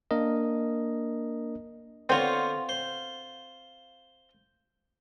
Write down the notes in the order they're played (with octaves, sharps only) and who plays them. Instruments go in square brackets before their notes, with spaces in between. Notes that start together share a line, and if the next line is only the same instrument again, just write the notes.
[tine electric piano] A#3 D4 A#4 D#5
[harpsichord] D3 B3 C#5 [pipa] C4 F4
[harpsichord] C5